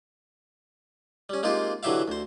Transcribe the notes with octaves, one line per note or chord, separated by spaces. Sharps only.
G3 C#4
G#3 A#3 C4 D#4 F4 G4
D3 E3 F#3 G4 E5 F5
D2 C5